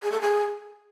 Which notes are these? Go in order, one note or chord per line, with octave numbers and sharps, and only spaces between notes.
G#4
A4
G#4